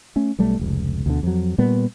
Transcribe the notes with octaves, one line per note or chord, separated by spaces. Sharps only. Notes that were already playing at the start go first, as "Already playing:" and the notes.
A3 C#4
B1 G3 A3
F1 C#2
D2 B2 D3
F2 F#3
A#2 G3 B3